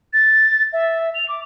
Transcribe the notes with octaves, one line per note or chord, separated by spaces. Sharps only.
A6
E5
F7
D6